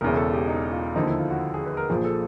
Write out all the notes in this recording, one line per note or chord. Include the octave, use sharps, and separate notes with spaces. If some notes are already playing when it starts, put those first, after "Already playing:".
E1 E2 C#3 A#4
A4
G4
D#4
F4
D#2 D3 F3 D#4
E4
F4
F#4
G#4
B4
A#4
A#1 A#2 F3 G#4
A4